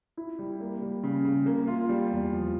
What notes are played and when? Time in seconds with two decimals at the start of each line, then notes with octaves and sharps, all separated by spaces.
0.17 E4
0.39 G3
0.60 A#3
0.82 G3
1.03 C#3
1.25 C#3
1.46 A#3
1.67 F4
1.89 G3
2.11 E2
2.33 F3